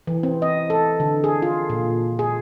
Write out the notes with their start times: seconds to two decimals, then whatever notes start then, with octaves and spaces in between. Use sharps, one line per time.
0.07 E3
0.23 C4
0.42 D#5
0.70 A4
1.00 D3
1.24 G#4
1.42 F4
1.70 A#2
2.19 G#4